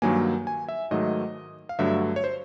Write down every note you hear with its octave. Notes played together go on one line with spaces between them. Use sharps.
G2 D#3 F#3 A#3 G#5
G#5
E5
G#2 D#3 F#3 A3 D#5
F5
G2 D3 F#3 A3 E5
C#5
C5